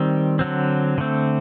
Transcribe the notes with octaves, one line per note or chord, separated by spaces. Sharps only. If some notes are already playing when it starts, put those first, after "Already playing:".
Already playing: D#3 G3 C4
D3 F#3 C4
D3 A3 C4